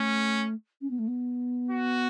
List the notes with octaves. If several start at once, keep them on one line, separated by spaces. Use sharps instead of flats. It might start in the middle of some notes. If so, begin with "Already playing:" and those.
Already playing: A3 C#4
C#4
B3
A3
B3
F#4